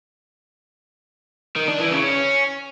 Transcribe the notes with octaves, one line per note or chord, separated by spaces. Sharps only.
D#3
D4
E3
C#3
C#4